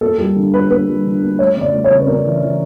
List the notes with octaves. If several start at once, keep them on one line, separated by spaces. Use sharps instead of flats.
A#3 A4
G3 A4
D3
A#3 B4
A#3 B4
G3
D3
A#3
A3 C#5
C#3 D5
A3
C#5
C#3
B4
C#3 A#4
E3
E3